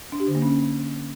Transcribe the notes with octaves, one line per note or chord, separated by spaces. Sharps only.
D4
G4
D3
A#3
C#4